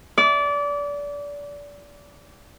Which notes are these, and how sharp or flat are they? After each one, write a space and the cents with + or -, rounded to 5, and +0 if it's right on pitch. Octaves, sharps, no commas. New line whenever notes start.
D5 -25